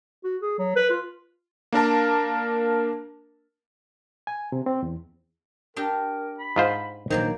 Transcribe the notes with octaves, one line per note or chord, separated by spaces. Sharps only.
F#4
G#4
F#3
B4
F4
A#3 D4 A#4 A5
G#5
C3
C4
E2
D4 G4 A#4
B5
G#2 F4 C5
A#1 D#3 F#3 A#3 C5 D5